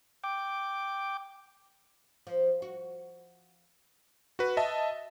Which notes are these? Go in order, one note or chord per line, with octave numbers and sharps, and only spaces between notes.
G5 D6
F3
F#4
F#4 B4
D#5 E5 A5